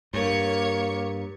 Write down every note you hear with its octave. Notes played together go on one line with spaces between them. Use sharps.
G2 A#3 C#5 C#7